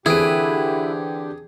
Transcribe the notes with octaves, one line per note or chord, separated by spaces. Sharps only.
D3 E3 C4 E4 G4 G#4 B4 D7